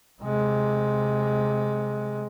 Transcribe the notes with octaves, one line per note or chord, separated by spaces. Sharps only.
C3 G#3